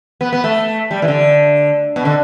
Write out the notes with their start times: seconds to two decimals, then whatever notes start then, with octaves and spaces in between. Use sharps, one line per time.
0.21 B3
0.33 B3
0.44 A3
0.91 G3
1.02 E3
1.08 D3
1.96 B2
2.05 D3